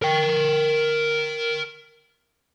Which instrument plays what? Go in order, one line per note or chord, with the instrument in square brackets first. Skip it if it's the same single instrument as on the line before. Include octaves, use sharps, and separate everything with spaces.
[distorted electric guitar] A#4 G5